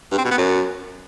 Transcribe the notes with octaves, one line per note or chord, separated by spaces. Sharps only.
G2
C4
B2
B3
F#2